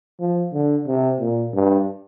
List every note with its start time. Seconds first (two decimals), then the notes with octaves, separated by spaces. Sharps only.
0.20 F3
0.53 D3
0.87 C3
1.20 A#2
1.53 G2